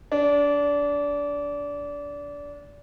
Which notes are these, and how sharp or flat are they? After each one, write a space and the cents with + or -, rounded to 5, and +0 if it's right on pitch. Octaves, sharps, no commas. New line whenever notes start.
D4 -25